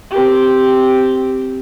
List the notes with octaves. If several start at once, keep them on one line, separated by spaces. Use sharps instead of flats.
C4 G4